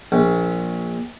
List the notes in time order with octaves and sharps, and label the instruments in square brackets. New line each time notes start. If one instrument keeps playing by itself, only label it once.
[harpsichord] A#1